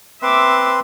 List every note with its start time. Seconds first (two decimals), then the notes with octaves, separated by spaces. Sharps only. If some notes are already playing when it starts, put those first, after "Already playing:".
0.22 C4 B4 E5 C6 D6